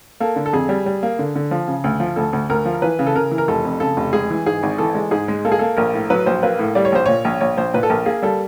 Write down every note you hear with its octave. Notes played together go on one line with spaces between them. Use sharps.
A#3 A4
D3
A4
F2 G#4
G3
G3
A#3
D3
D3
F3
C#3
D2
F3
D2 A4
D2
D2 A#4
F3
E3 B4
C#3
A4
C#3 A#4
E3
A#4
F1 A4
F2
C#3 A4
F1
G#3 G#4
E3
G#2 G#4
G#1
E3 A4
G#3
G#2 G#4
G#3
A#3 A4
G#4
A#3 A4
A#1 A#4
A2
F#3 B4
A#1 C5
A#3 B4
A2
G3 D5
C#5
A#1 C5
A#2 C#5
A#1
A#1 C#5
A#1 C5
A#2 B4
A4
A#1 A#4
A#3 G#4
G3 A4